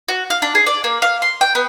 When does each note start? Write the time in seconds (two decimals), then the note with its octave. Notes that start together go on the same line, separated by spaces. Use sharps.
0.08 F#4
0.30 F5
0.42 D4
0.55 G#4
0.66 D5
0.84 A#3
1.02 F5
1.22 C6
1.41 G5
1.55 B3